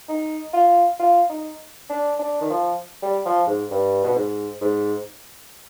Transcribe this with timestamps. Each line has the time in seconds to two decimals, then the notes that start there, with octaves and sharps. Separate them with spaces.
0.09 D#4
0.53 F4
0.99 F4
1.29 D#4
1.90 D4
2.19 D4
2.41 D#3
2.50 F3
3.02 G3
3.26 F3
3.47 G#2
3.71 G2
4.04 B2
4.15 G#2
4.61 G#2